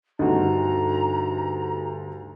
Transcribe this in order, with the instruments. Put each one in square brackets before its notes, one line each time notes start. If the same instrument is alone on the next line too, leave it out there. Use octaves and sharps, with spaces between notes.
[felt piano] D2 G2 D3 [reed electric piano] D#4 F#4 [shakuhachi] A#5